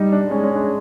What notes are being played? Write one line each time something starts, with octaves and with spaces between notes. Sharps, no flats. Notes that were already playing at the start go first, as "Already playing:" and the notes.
Already playing: G3 D#4
D4
G#3 C#4
C#4
D4